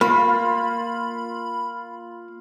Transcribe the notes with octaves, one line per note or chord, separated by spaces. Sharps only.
A#3 F4 B5